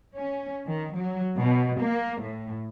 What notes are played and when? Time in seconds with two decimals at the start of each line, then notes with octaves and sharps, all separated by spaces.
0.17 C#4
0.66 D#3
0.97 F#3
1.37 B2
1.80 A#3
2.22 A2